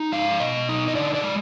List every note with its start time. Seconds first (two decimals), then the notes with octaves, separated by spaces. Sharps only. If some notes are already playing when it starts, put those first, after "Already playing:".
Already playing: D#4
0.12 G#3 F5
0.40 B2 D#5
0.69 D#4
0.88 D#5
0.95 D3 D5
1.14 D5
1.23 G#3